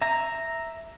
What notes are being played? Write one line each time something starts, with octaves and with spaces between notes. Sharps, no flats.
E5 A#5